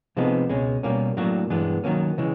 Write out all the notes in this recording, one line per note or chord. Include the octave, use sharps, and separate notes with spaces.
C3 F3 G#3 B3 D#4
C#2 B2 G#3 C#4
B2 G3 A#3 C#4
A2 F#3 A#3 D4 F#4
G2 E3 G#3 B3 D4
D#3 F#3 A#3 C#4
C#3 E3 G#3